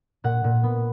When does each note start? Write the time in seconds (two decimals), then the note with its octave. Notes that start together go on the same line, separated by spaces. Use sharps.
0.24 A#2 F#5
0.44 A#2
0.63 B3